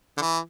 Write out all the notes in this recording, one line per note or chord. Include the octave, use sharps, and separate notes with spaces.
D3
E3